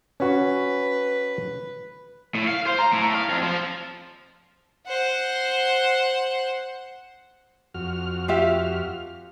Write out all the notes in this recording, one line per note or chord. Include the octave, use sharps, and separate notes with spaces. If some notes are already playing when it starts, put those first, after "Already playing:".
C#4 F#4 B4
A2
F5
C5
A#5
A2
F5
F2
F3
C5 F#5
F2 F#4 F6
F4 G4 E5